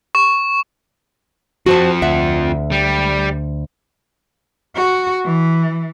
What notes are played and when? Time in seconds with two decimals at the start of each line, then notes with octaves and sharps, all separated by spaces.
0.15 C#6
1.66 F2 F3 F#4 C5 A5
2.02 D2 E5 F#5
2.72 G3
4.76 F#4
5.25 E3